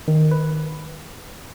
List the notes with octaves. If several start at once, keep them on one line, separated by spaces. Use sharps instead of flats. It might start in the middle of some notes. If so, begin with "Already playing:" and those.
D#3
B4